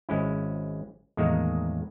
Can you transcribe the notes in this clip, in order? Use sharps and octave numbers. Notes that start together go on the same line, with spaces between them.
G#1 G#3 C#4 E4
E2 A2 D#3 G#3 A#3